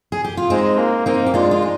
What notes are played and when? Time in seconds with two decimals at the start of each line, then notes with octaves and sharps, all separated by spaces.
0.12 G#4
0.24 G4
0.37 F4
0.50 G#3 C4 D#4
0.78 A#3
1.06 A#3 C4 D#4
1.26 G4
1.34 G#3 D4 F4
1.51 F4
1.62 D#4